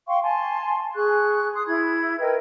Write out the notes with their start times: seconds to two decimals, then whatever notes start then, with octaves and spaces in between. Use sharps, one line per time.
0.08 F5 G5 C6 C#6
0.22 G#5 A5 C6
0.94 G#4 C#6 F#6
1.54 C6 D#6
1.67 E4 B5 G#6
2.20 A#4 B4 D#5 G5